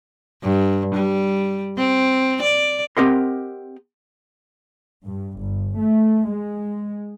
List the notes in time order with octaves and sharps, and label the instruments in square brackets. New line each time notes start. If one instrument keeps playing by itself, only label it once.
[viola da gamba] G2
G3
C4
D5
[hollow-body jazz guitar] C4 G4 A#4 D#5 F#5 C6
[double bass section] G2
G1
A3
G#3